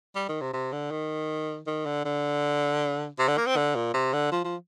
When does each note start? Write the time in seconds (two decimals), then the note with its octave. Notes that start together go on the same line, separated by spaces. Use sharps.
0.15 G3
0.29 D#3
0.41 C3
0.53 C3
0.72 D3
0.91 D#3
1.67 D#3
1.86 D3
2.05 D3
3.19 C3
3.28 D3
3.37 A#3
3.47 C4
3.56 D3
3.75 A#2
3.94 C3
4.13 D3
4.32 F3
4.44 F3